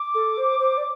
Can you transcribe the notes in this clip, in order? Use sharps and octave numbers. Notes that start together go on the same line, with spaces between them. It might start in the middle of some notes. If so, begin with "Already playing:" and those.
Already playing: D6
A4
C5
C5
D5